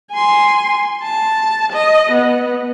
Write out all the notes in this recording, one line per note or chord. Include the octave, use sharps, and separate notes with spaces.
G#5 C6
A5
D#5
B3